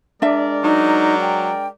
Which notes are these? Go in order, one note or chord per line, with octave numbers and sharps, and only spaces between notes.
G#3 D4 A#4 D5 E5
F#3 D#4
G5